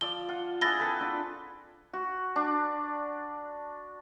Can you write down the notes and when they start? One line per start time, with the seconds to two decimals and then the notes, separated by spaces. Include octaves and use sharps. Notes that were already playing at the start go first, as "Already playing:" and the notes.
0.01 F3 D5 E6 G7
0.29 F4 F#5
0.61 D4 E4 G#4 F#5 A6 A#6 G7
0.80 C4 A4 B4
1.01 D4 F4
1.93 F#4
2.36 D4